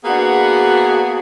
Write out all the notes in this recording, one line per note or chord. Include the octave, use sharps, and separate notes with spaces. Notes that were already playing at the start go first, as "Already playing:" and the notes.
A#3 B3 D4 F#4 G#4